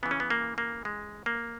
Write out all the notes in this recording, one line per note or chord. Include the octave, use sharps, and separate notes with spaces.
C#3 E3 B3
C#4
B3
A#3
A#3
G#3
A#3